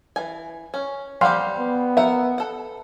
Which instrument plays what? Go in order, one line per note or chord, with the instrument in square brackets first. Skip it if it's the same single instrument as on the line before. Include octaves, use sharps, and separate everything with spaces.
[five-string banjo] E3 G#5
C#4
[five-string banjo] G3 C4 G4 [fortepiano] F5 F#5 C6
[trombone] B3
[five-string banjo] A#4 F#5 [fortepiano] E5
[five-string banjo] A4 F#5